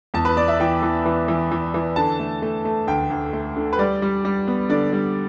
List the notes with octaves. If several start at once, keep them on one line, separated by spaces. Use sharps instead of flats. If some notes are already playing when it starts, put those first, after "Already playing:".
E2 A5
B4
B3 D5
E5
E3 G5
E3
E3
E3
E3
E3
D3 A5
A3
A3
A3
D2 G5
D2
A3
D3
B4
G3 D5
G3
G3
B3
D3 D5
G3